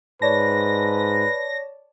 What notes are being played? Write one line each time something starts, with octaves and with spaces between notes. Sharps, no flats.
G#2 B4 C#5 D5 A5 A#6